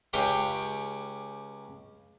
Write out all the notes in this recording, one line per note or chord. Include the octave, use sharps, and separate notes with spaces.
C#2 C#4 G4 G5 C6